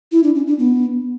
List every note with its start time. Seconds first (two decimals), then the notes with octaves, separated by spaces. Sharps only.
0.12 E4
0.23 D4
0.35 C#4
0.47 D4
0.59 B3